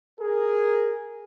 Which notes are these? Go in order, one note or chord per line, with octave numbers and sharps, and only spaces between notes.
G#4 A#4